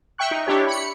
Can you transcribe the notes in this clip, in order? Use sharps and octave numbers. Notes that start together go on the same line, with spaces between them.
E5 G5 C#6 F#6
D#4
D4 E4 G4 C#5
B5 C#7